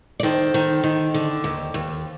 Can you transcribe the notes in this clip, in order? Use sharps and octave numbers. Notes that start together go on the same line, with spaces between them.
D5
D#3 A4 C5
D#3
D#3
D3
D#2
D#2